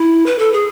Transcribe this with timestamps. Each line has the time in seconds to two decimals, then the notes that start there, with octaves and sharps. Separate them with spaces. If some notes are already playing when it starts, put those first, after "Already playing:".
Already playing: E4
0.26 B4
0.38 A4
0.53 G#4